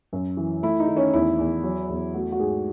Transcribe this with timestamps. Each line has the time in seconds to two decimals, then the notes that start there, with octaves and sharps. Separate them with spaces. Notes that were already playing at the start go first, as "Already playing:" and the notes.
0.13 F#2
0.37 E3
0.63 A3 E4
0.80 D#4
0.88 D#3
0.97 C#4
1.13 E2 E4
1.39 E2
1.64 F#3
1.89 E2
2.14 A3 F#4
2.32 F#4
2.40 G#2 G#4